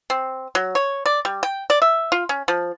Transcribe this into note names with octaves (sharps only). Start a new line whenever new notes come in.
C4
F#3
C#5
D5
G3
G5
D5
E5
F4
C#4
F3